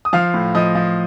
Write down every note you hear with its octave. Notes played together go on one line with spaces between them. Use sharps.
D#6
F3 F5 F6
A2
F3 D#5 D#6
F3